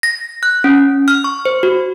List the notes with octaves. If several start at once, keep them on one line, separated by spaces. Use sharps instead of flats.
A#6
F#6
C#4
F6
C#6
C5
F#4